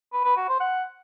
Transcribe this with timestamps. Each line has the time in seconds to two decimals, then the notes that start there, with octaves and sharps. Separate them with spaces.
0.13 B4
0.25 B4
0.37 F#4
0.49 C5
0.60 F#5